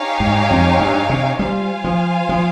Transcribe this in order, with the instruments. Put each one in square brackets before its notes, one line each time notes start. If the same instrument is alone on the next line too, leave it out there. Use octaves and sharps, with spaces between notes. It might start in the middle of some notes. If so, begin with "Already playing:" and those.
Already playing: [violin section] D#4 G4 C#5 F5 G#5
[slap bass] G#2
F2
G2
C3
[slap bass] G3 [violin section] F4 C5 F5 G#5
[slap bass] F3
F3